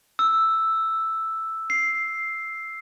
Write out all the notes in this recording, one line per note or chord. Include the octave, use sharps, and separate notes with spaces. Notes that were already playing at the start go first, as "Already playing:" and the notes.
E6
C7